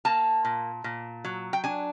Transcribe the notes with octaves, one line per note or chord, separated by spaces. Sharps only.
A#3 A5
A#2
A#2
F#3
G5
D4 G#5